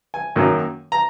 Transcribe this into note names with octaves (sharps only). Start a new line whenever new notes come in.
G#5
F#2 D#3 F#3 A#3
A#5